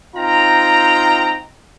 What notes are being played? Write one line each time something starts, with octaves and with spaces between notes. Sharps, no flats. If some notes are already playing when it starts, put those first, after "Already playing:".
C4 D#4 F4 G5 A#5